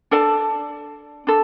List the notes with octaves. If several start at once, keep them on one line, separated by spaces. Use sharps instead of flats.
D4 A4 D5 A5
D4 A4